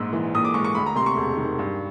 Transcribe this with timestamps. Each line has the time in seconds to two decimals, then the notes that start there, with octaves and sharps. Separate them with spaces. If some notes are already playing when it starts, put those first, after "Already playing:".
Already playing: A#1 G#2 E6
0.13 E3
0.35 A#1 D#6
0.45 D6
0.54 G#3 C#6
0.65 C#6
0.75 D2 B5
0.86 A#5
0.96 C3 C6
1.06 C#6
1.17 E1
1.37 D#3
1.59 G2